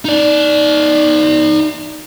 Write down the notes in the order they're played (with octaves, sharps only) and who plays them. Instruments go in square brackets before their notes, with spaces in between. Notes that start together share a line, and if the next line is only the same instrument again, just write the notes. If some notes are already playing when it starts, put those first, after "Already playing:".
[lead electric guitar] D#4 D5